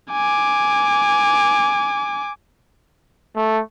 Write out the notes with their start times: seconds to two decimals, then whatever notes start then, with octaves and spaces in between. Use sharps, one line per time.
0.11 G#5 D6
3.36 A3